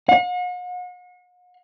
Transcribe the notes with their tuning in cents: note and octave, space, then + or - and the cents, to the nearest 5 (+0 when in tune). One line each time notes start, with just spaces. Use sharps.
F#5 -45